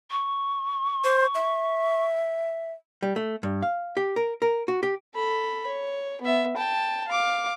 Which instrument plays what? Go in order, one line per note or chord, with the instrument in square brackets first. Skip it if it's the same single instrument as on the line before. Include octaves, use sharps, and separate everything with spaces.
[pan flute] C#6
[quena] C5
E5
[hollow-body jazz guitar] G3
A3
G2
F5
G4
A#4
A#4
F#4
G4
[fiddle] A4 B5
C#5
B3 E5
G5 A5
F5 D6